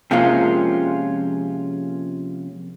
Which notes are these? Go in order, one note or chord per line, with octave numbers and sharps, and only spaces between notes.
C3 F3 G#3 A#3 C#4 F4